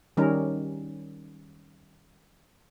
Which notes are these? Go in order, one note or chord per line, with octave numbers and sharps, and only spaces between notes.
D#3 G3 C#4 D#4 A#4